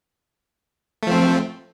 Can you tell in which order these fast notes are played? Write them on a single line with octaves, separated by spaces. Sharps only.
A3 F3 C4